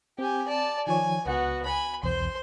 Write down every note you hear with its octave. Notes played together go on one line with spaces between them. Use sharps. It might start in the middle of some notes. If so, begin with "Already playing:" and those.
C4 G4 G#5
D5 A5
D#3 F3 C#5 G#5
C#2 B3 F#4 F#5
G#5 B5
B1 E2 C5 C6